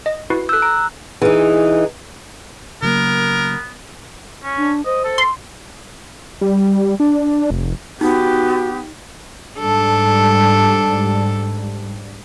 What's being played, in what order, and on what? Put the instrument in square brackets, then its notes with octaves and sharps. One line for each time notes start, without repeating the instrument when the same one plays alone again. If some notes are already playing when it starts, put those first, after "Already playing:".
[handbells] D#5
E4 F#4 B4
[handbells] A4 G6 [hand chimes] E6 F#6
[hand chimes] A#5 [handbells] D7
[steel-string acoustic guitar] E3 D#4 [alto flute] G#4
[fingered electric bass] C#3 F#3 A#3 [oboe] B3 [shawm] A#4
[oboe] C#4
[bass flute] D4
[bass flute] C5 [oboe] D#5
[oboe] A4
[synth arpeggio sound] C6
[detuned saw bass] G3
D4
F1
[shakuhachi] B3 [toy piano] D#4 [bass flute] F#4 [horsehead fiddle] G4
[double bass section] G#2 G3 [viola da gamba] D4 A4